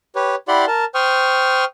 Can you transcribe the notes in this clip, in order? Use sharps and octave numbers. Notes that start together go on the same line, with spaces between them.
G4 B4 C#5
E4 G4 D5 F#5 B5 C6
A#4 A5
C5 G5 C#6 D#6 F6